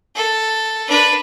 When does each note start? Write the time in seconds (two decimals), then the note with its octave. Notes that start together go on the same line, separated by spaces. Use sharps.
0.16 A4
0.88 D4 B4